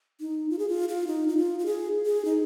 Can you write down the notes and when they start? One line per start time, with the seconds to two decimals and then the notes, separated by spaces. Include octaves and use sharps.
0.20 D#4
0.50 F4
0.59 G#4
0.68 F4
0.89 F4
1.07 D#4
1.28 D#4
1.37 F4
1.59 F4
1.66 G#4
2.06 G#4
2.25 D#4